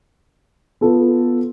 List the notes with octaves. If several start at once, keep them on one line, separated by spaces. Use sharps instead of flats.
B3 F4 A4